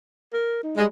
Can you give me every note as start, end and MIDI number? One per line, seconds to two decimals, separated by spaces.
0.34 0.63 70
0.63 0.73 63
0.77 0.88 55
0.77 0.85 56